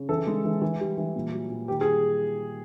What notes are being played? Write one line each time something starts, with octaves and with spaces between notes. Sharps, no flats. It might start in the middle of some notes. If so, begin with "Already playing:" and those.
Already playing: C#3
E3 A4
G#3
E3
E3
G3
E3
A#2
F#3
A#2
D#3 G4
G#4
G3